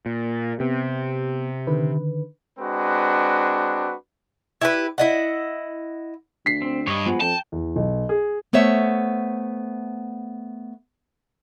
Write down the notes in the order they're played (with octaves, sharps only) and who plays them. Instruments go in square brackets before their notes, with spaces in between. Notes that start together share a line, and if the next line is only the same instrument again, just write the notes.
[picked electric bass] A#2
[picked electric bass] C3 [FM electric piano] B3 G4
[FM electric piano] D3 D#3 B4
[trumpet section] G#3 C4 D4 F#4 B4
[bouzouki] E4 G4 B4
E4 D#5 F#5
[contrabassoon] D2 [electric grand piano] B6 C7
[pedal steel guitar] C4
[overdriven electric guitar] G2 [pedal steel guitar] C#5 D#5
[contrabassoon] F3 [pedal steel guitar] G#3 B3
[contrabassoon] F2 [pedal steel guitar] G5 [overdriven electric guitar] A5
[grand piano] E2
B1
G#4
[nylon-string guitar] A3 B3 C5 C#5 E5